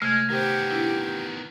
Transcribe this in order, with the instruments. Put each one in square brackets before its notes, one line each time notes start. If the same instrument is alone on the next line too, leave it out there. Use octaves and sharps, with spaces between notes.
[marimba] C3 A3 [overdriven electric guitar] G#3 [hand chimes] F6 G#6
[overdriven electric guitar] D#3 B3 [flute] G4 [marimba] A#4 C5
[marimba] D4 E4